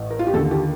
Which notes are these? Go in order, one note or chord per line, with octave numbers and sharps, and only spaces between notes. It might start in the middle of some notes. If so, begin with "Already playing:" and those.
Already playing: A1 A2
A#4
F4
G4
D#2 D3 A4
G4